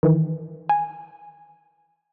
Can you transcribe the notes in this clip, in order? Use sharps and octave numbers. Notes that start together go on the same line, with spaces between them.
D#3 E3
G#5